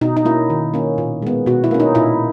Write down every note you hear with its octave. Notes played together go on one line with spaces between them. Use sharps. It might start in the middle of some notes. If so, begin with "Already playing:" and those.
B2 D#4
D#4
A#3 C#4 E4
D#3
A#3 C#4
A#2
G#3 B3
B2 F#4
E4
A#3 C#4
D#4
A#2 E4